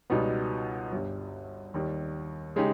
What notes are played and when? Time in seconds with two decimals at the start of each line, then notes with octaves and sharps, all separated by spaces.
0.10 C#2 B2 G3 B3 D#4
0.92 G1 G2 G3
1.74 D#2 D#3 G3
2.56 C#3 G#3 D#4 G4